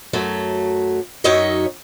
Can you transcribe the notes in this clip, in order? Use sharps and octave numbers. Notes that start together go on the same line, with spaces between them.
F#2 F#3 A3
F#2 F#3 D#4 C#5 D#5 E5